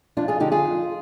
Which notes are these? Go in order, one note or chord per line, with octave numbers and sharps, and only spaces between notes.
F2 D4 F4
F4 G#4
D3 F3 D#4 G4
F4 G#4
F2